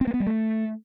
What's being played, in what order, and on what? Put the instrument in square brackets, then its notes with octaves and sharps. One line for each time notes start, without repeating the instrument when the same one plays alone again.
[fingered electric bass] C4
A#3
B3
G3
A3